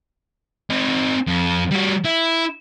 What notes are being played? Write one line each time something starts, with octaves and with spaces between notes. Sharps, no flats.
C4 D#4
F2
G3 F#4
E4